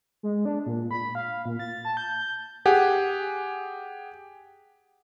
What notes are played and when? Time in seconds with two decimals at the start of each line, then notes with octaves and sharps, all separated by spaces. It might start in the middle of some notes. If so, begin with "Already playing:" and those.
0.23 G#3
0.45 D4
0.66 A#2
0.91 B5
1.15 F5
1.45 A#2
1.59 A6
1.85 A5
1.97 G6
2.66 G4 G#4 F#5 G#5